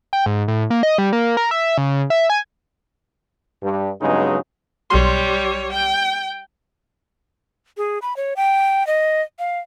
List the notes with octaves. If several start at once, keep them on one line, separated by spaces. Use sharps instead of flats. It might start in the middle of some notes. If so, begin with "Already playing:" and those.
G5
G#2
A2
A#3
D#5
G3
A#3
A#4
E5
C#3
E5
G#5
G2
G2 C#3 F#3 G#3 B3 D#4
B1 G3 C#5 C6
G5
G#4
B5
C#5
G5
D#5
F5